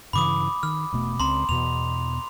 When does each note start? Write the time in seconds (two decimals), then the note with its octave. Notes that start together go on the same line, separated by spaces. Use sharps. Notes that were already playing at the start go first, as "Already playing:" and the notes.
0.13 G2 C#3 E3 B5 D6 D#6
0.63 D#3 F6
0.93 E1 B2 A3
1.20 C#2 C4 A#5 C6
1.49 E2 B2 F7